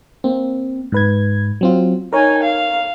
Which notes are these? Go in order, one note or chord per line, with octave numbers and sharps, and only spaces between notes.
A#3 C4
G#2 B4 G#6
F#3 C4 F4
D#4 A#4 C#5 G#5
F5